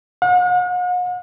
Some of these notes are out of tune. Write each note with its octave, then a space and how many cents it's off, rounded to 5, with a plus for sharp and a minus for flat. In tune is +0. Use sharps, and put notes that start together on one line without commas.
F#5 -45